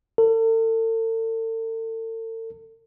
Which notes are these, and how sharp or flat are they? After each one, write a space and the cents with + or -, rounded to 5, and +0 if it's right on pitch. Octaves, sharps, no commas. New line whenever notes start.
A4 +40